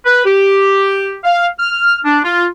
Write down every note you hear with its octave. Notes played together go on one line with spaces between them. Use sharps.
B4
G4
F5
F6
D4
F4